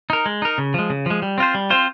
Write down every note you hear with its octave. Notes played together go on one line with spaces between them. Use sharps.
D#4 A#4
G#3
D#4 A#4
C#3
F3 G#3
C#3
F3 G#3
G3
C4 F4 C5
G3
C4 F4 C5